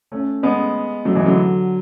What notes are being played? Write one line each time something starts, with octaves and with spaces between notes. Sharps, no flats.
A3 C#4
G#3 B3
F#3 A3
E3 G#3
D3 F#3